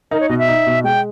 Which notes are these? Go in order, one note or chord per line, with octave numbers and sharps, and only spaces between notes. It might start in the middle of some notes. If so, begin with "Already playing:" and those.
D#4 A#4
C#5
B2 D#5
E5
D#4
B2
G#3 G5